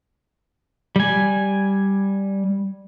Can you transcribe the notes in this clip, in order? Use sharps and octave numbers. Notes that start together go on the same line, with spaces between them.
G3 G#5